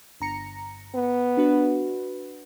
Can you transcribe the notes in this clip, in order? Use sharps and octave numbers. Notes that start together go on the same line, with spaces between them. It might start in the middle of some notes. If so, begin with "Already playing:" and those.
G1 A#5 C#7
B3
D4 F#4 B4